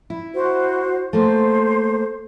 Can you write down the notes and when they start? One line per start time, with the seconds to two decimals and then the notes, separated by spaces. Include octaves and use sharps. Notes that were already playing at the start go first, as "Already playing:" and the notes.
0.10 E4
0.34 F#4 C5
1.13 A3 A#3 C5